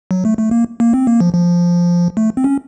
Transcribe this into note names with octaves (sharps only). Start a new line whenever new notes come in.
F#3
A3
A3
A#3
A#3
C4
A#3
F3
F3
A3
C4
C#4